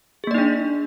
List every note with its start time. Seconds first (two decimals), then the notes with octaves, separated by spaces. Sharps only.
0.24 G#4
0.27 A#3
0.31 D5
0.34 D#4
0.38 D4